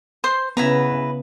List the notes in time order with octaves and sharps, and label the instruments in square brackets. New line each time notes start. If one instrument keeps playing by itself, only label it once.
[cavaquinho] C5 C6
[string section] C#3 [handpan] B3 [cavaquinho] E4 B4 A#5